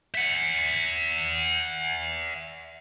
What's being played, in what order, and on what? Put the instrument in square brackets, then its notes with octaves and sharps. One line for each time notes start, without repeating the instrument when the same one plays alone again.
[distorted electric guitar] E5 F#5